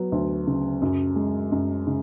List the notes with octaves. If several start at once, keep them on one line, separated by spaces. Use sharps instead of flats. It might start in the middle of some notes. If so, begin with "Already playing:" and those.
Already playing: F#3 B3
D2
C#3
F#2
G#3
F#2
C#3